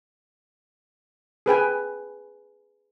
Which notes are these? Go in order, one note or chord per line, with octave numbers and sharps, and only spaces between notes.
G#4 B4 G5 G#5